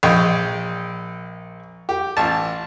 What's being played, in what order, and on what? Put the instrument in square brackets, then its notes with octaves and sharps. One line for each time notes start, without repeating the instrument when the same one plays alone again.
[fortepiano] A#1 D#5 G5
G4
A1 A5